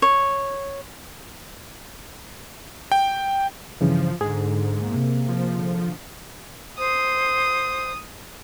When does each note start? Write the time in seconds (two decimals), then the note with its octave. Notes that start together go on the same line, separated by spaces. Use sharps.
0.02 C#5
2.92 G5
3.81 G2 C#3 E3 F3
4.21 G#2 D3 G#4
4.85 C3 A#3
5.29 F3
5.57 D3
6.78 C5 D#6